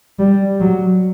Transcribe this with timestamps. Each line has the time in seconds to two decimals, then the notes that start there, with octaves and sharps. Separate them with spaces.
0.19 G3
0.60 F#3